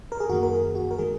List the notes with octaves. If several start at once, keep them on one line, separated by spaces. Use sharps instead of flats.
A#4
G#4
F#2 D#3 A#3 F#4
A#4
G#4
F#4
A#4
D#3 G#3 G#4